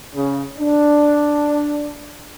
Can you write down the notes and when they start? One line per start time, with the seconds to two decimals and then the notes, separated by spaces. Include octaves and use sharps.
0.14 C#3
0.58 D4